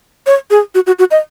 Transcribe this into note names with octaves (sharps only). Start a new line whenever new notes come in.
C#5
G#4
F#4
F#4
F#4
D#5